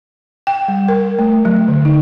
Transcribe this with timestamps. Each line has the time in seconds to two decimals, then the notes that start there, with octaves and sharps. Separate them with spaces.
0.47 G5
0.68 G3
0.88 A#4
1.19 A3
1.45 F#3
1.68 D3
1.85 D#4